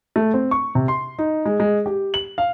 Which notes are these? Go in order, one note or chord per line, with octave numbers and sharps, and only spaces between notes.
A3
C4
C#6
C3
C6
D#4
G#3
G#3
G4
F#7
F5